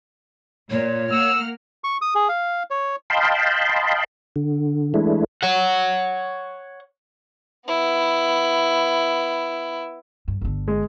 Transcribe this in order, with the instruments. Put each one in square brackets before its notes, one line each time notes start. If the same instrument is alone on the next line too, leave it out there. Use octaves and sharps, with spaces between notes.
[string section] A#2 [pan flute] C#5
[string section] A#3 F#5 F6 [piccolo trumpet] E6
[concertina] C#6
D#6
G#4
F5
C#5
[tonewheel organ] D#5 F5 G5 A5 B5 C6
D3
E3 G#3 A3 D4 E4
[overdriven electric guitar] C#5 F#5
[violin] B3 E4
[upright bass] G2
G1 D3
[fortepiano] G#3